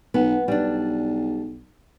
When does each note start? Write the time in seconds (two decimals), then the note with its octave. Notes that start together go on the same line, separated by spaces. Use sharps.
0.14 B1 B3
0.48 B1 G3 D4